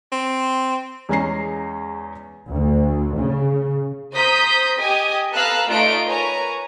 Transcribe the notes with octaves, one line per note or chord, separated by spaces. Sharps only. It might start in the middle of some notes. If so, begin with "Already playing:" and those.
C4
E2 G#3 C#4 A#5 C7
D2
C#3
C5 A#5 D#6 G6 B6
G4 D#5 G#5 D#6
A4 B4 F5 A#5 E6 F#6
A3 D#4 F4 D5 D7
A#4 B4 C#5 G#5 A#5